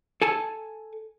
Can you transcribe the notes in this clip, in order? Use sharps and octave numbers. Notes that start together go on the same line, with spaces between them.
A4 G#5 A5